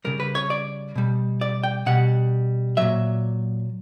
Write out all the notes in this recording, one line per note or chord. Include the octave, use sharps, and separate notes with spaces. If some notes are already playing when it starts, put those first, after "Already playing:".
C#3 G3 A#4
B4
C#5
D5
B2 G3
D5
G5
B2 G3 F#5
A#2 F#3 E5